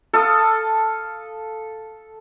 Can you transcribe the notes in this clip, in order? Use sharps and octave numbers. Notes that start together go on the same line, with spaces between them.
A4 F5 D#6